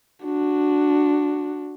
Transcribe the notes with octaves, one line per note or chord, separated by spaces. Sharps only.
D4 F#4